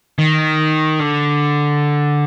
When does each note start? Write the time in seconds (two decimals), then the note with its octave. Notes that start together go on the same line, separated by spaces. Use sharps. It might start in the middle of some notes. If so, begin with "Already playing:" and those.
0.19 D#3
1.00 D3